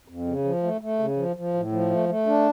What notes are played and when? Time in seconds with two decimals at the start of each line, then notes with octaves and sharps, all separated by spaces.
0.08 F2
0.27 C#3
0.44 F3
0.63 A3
0.81 A3
0.99 C#3
1.17 F3
1.36 F3
1.54 A2
1.72 F3
1.91 A3
2.09 A3
2.27 D4